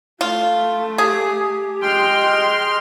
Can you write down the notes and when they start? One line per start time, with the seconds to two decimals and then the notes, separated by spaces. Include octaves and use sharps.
0.21 A3 F4
0.98 G4 G#4
1.83 G#3 G5 C6 F6